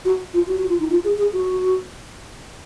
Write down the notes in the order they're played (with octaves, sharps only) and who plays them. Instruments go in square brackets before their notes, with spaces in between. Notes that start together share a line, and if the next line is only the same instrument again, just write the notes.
[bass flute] F#4
F4
F#4
F#4
F4
D#4
F4
G#4
G#4
F#4